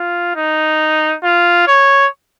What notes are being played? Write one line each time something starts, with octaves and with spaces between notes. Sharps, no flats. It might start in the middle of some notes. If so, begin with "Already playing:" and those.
Already playing: F4
D#4
F4
C#5